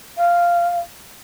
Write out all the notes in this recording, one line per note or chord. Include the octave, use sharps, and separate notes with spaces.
F5